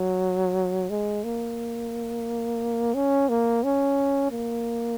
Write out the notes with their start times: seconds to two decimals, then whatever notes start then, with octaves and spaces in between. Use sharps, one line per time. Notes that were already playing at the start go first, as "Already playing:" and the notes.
Already playing: F#3
0.90 G#3
1.24 A#3
2.95 C#4
3.29 A#3
3.64 C#4
4.32 A#3